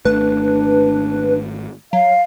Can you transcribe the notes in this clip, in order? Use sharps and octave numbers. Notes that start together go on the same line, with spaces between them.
G#1 A3 D4 B4
F#3 F5